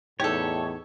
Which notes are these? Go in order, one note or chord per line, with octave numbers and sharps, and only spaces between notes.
E2 A2 D#4 G4 A4 C#5